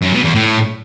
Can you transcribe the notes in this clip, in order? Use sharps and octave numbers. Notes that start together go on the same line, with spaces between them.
F#2
B2
E2
A2